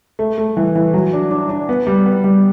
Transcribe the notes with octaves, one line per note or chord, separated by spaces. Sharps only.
A3
A3
E3
E3
F#3
D4
D4
D4
B3
G3
B3
G3